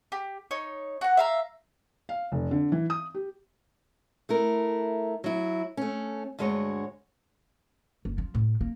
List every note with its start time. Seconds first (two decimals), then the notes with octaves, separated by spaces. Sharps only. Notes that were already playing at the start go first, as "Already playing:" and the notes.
0.12 G4
0.51 D#4 C#5
1.01 F#4 F#5
1.17 E5 F5 A#5
2.09 F5
2.32 F1
2.51 D3
2.72 E3
2.90 D#6
3.14 G4
4.29 A3 E4 A#4
5.24 F#3 E4
5.77 A3 C#4
6.39 D2 G2 G#3 F#4 C#5
8.05 F#1
8.18 F3
8.35 A2
8.61 A#3